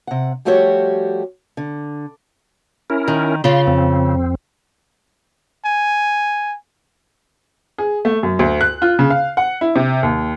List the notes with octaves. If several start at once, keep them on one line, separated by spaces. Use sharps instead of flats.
C3 F#5
F3 G3 A3 F#4 G4 C#5
D3
C#4 E4 A#4
D#3
C#3 F4 C6
F2 C4
G#5
G#4
A3
F#2
D2
F#6
F4
C#3
F5
F#5
E4
C3
D#2